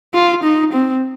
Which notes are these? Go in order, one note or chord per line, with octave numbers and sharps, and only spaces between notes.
F4
D#4
C4